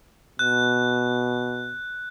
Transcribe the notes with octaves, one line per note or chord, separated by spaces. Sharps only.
B2 F#6